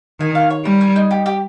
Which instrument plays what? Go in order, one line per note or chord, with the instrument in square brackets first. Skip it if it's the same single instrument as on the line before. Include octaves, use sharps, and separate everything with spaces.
[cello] D#3 [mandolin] G#5
[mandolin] F5
C#5
[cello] G3 [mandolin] A#4
[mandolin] G#5
D#4
G4
G4